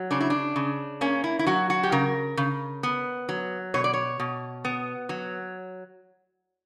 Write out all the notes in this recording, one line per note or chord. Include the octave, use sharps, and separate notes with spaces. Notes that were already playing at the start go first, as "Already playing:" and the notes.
Already playing: F#3
C#3 D4
E4
D4
C#3
A#3 C#4
E4
E4
F#3 F#4
F#4
G4
C#3 A#4
C#3
B3
F#3
B2 C#5
D5
C#5
B2
B3
F#3